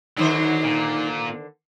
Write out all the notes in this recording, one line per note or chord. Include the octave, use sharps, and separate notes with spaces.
D3 D#3 F#3 D#4 C5
A#2